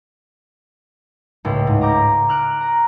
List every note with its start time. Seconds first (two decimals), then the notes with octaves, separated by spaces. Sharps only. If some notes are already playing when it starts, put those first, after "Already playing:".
1.45 C#2 A2
1.67 G#2
1.81 A#5 D6 G6 A#6
2.29 F6 F#6 D7
2.61 A#5